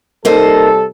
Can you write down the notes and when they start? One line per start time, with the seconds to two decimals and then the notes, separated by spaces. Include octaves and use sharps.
0.25 C3 G3 A#3 D#4 A4 C5